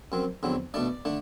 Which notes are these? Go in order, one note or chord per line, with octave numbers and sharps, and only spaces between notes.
F#2 F#3 C4
E2 D3 F#3 C4
B2 A3 D4 D5
D3 A3 D4